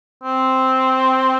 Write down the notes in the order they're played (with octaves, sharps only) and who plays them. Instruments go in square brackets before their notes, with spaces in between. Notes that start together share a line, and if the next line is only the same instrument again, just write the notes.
[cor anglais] C4